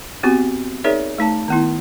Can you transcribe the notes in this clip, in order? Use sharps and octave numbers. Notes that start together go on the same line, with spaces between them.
B3 C4 F#4 G4
D#4 G#4 A#4 C#5 D5 E5
A3 D#4 A5
D#3 B3 E4